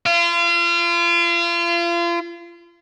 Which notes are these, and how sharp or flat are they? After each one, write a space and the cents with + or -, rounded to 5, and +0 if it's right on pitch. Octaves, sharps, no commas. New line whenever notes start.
F4 -35